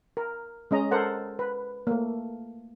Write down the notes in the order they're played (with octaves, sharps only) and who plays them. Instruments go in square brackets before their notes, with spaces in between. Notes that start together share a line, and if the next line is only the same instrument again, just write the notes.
[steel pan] A#4
G#3 C#4 D#5 A#5
A4 A#4 C5 F#5
B4
A3 A#3